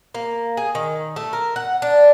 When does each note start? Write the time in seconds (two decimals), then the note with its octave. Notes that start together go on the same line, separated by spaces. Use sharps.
0.15 A#3
0.57 G#4
0.75 D#3
1.16 A3
1.33 A#4
1.56 F#5
1.82 D4